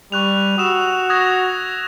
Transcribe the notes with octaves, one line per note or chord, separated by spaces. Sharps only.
G3 C#6 F#6 F7
F#4 D#6 E6 E7
D#6 G#6 A#6